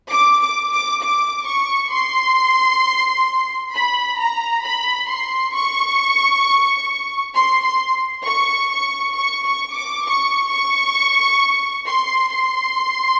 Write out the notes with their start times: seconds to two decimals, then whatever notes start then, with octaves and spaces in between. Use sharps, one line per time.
0.12 D6
0.41 D6
0.72 D6
1.02 D6
1.46 C#6
1.92 C6
3.73 B5
4.18 A#5
4.63 B5
5.09 C6
5.54 C#6
7.35 C6
7.64 C6
8.25 C#6
8.70 C#6
9.14 C#6
9.45 C#6
9.75 D6
10.05 C#6
10.50 C#6
11.85 C6
12.31 C6